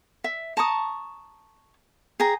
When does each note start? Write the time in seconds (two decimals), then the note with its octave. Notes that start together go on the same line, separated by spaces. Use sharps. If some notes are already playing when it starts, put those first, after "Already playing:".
0.24 E5
0.57 A5 A#5 C#6 D#6
2.20 G#4 G5 A#5